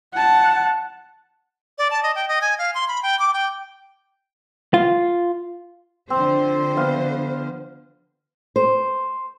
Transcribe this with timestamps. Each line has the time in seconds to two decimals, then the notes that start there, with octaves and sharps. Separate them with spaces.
0.14 F#5 A5
1.78 D5
1.91 A5
2.03 D#5
2.15 G5
2.28 D#5
2.42 G#5
2.59 F5
2.75 C6
2.88 B5
3.03 G5
3.19 D6
3.33 G5
4.74 F4
6.10 D3 F3 C4 C5
6.77 B3 F5
8.56 C5